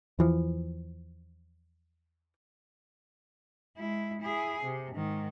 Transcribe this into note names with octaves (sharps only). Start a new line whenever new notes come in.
E2 E3 F3
G#3 E4
E4 G#4
C3
G#2 D#3